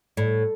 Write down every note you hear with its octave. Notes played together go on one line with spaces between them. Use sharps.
A2